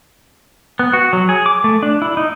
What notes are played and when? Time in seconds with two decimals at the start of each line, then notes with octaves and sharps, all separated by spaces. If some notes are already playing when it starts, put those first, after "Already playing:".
0.79 B3
0.93 F#4
1.13 F#3
1.29 G#4
1.46 D6
1.64 A3
1.83 D4
2.02 E4
2.17 D#4